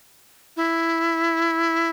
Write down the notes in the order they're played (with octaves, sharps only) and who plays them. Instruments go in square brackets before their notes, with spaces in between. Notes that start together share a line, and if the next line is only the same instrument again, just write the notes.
[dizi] E4